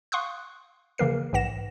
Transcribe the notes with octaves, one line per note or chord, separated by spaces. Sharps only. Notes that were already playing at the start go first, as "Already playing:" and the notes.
F5 C6 C#6 D#6 F#6
C#3 E3 A#3 A#4 C7
A#1 G#2 E3 F#5 A#6 E7